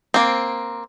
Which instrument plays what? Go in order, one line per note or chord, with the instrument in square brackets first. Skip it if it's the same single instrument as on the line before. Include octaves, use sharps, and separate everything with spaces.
[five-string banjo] A#3 C4